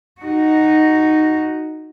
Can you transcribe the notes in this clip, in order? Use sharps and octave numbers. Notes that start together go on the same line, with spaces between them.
D#4 F#4